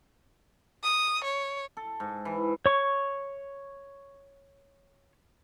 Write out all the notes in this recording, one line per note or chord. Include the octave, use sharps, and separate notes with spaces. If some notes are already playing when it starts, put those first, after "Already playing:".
D#6
C#5
A4
G#2
E3
C#5 C#6